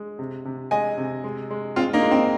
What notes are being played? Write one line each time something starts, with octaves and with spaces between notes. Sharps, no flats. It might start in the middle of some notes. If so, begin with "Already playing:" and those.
Already playing: G#3
C3
C3
G#3 D#5 G#5
C3
G#3
G#3
G#3 C4 F4
A#3 D#4
G#3
C4